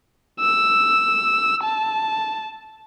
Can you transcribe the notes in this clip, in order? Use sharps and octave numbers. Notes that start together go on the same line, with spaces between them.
E6
A5